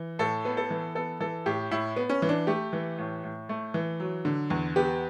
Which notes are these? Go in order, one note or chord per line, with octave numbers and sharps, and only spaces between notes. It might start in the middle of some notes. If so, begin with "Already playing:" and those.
Already playing: E3
A2 A4
B3
A4
E3
B3 A4
E3 A4
A2 G4
A2 E4
B3
C#4
E3
D4
A3 G4
E3
A2
A2
A3
E3
F#3
D3
E2
B3 G4